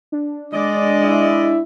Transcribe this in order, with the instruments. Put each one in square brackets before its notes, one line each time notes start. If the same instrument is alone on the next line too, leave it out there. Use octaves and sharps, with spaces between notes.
[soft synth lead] D4
[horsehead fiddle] G#3 [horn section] D5 D#5
[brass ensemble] E4 E5